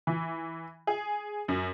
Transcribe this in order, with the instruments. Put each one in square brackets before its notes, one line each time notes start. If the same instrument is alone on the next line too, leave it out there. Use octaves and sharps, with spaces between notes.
[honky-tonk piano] E3
G#4
F#2